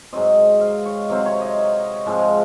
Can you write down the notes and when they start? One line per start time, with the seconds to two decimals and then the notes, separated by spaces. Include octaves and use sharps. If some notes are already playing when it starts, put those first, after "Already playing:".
0.13 G#2 F#3 C4 D#5
0.61 F5
0.86 C#5
1.09 C3 F#3 C4 F5
1.26 C#5
1.41 D#5
2.06 G#2 F3 G#3 C4